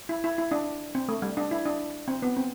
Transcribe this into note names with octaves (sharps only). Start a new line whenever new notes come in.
E4
E4
E4
D4
C4
A3
G3
D4
E4
D4
C4
B3
C4